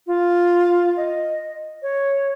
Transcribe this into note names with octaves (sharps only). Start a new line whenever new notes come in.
F4
D#5
C#5